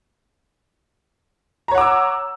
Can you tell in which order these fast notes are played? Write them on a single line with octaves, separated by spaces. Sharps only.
A#5 C#5 F#5 D6 E6